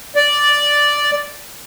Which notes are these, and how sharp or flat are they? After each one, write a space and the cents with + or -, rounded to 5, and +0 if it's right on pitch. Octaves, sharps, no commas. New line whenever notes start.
D5 -5